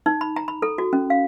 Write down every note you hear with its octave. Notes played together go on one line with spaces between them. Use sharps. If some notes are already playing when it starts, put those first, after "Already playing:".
D#4
B5
A#5
B5
A4
F#4
C#4
F5